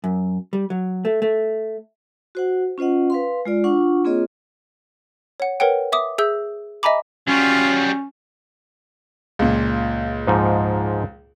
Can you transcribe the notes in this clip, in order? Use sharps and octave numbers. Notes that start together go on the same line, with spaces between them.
F#2
G3
F#3
A3
A3
F#4 C5 F#5
C#4 F4 C5 D#5 F#5
B4 F5 C6
G#3 F4 D5
D4 F4 F#5 C#6
A#3 C4 F4 G#4 C#5 D#5
C#5 F#5
A#4 B4 C#5 F#5 G5
E5 D6 D#6
G#4 E5 E6 G6
D#5 E5 G#5 A#5 B5 D6
F#3 G3 C#4 F4
C#2 A#2
G#2 F3 D#4